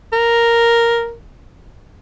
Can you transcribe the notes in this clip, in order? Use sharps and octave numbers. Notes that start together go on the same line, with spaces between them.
A#4